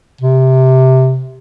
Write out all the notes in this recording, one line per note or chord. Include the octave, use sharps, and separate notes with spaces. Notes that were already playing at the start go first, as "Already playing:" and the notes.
C3